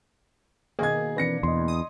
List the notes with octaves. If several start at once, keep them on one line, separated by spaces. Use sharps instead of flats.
B2 D#3 A#3 G#4 D#5 G#6
E3 C4 D4 B4 A#6 C#7
E2 D#5 C6
D#6